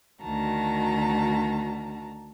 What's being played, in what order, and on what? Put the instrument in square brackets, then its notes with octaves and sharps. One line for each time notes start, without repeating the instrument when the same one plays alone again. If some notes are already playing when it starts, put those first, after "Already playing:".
[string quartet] D2 D#3 F#4 A5 A#5